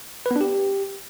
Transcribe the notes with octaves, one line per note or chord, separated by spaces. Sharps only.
B4
B3
D4
G4